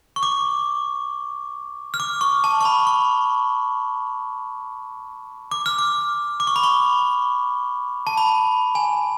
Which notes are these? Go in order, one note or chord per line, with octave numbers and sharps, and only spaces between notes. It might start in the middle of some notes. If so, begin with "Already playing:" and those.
C#6
D6
F6
D6
C#6
A5
C#6
B5
C#6
D6
F6
D6
D6
C#6
B5
C#6
A5
B5
G#5